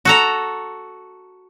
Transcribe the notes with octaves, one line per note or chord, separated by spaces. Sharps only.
F#4 A4 A#5